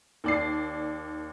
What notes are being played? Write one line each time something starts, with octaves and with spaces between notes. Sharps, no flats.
D#2 D5 C7